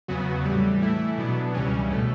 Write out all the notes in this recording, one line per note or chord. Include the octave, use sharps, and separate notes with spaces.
E2 C#3 F#3 B3 F#4
A2 E3 G3
E3 A3 E4
B2 F#3 B3 D4
C#2 C#3 E3 G3 C#4
B2 A3